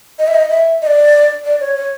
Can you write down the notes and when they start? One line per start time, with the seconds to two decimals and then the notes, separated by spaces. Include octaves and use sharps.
0.19 D#5
0.28 E5
0.35 D#5
0.50 E5
0.82 D#5
0.87 D5
1.45 D5
1.60 C#5
1.76 C#5